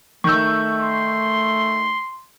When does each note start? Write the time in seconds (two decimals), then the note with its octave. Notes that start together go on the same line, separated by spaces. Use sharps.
0.24 D#3 A3 C#6 E6 G6
0.81 C6